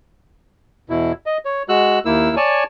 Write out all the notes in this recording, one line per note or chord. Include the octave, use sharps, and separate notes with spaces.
E2 B2 E4
D#5
C#5
G#3 F#4 E6 F#6
D#2 A#3 E4 E6
C#5 D5 G#5 A5